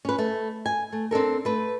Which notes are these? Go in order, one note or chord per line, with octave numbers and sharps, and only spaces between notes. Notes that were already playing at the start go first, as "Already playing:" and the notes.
C#4 B4
A3
G#5
A3
C4 D4 A4 A#4
A3 B4